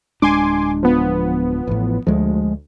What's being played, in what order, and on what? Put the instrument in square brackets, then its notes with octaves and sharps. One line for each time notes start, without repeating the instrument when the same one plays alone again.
[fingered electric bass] D1 G#3 D4 [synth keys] G#5 C6 D6
[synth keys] F3 B3
[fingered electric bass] A1 A2
[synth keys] D2 [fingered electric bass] F3 G#3